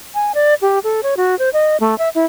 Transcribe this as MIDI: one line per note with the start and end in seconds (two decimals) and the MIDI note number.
0.15 0.32 80
0.35 0.54 74
0.62 0.79 67
0.84 1.01 69
1.03 1.15 73
1.17 1.38 66
1.39 1.50 72
1.53 1.77 75
1.80 1.97 57
1.99 2.09 76
2.15 2.25 64